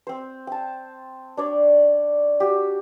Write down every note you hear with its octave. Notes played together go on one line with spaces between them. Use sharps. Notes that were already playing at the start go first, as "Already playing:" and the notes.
C4 C5
G5 A5
D4 C#5 D5
F#4 G4